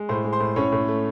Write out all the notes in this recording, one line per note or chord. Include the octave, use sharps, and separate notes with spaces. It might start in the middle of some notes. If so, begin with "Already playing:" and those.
Already playing: G#3
A2 C5 C6
G#3
C5 C6
A2
A2 C#4 C#5
A2
A3